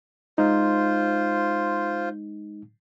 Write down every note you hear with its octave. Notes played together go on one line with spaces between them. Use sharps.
G#3 D#4 F4 C5